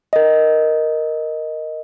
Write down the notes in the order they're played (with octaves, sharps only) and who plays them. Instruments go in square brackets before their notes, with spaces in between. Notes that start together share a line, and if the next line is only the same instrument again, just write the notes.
[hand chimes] A#4 D#5